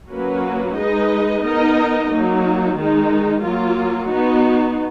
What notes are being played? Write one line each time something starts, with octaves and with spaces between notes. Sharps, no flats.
F#3 A#3 C#4 F#4 B4
G#3 D#4 G#4 B4 D#5
B3 D#4 A#4 D#5
F#3 A#3 D#4
D#3 G#3 D#4
F#3 A#3 F4
B3 D#4 F#4